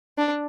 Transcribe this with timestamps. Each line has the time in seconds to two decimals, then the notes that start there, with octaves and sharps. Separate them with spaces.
0.18 D4